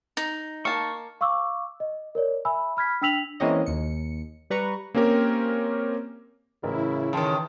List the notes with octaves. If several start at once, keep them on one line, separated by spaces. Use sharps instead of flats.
D#4
A#3 A5 C#6
F5 C#6 D6 E6
D#5
A#4 C#5 D5
E5 G#5 B5 E6
B5 F6 G#6 B6
D4 G5 E6 B6 F7 F#7
E3 G#3 A#3 C4 C#4 D#5
D#2 C#7
G3 B4 A#5 C#6
A#3 C4 C#4 G4 A#4
A1 C#3 E4 A#4
A2 D#3 E3 G5 A5 C6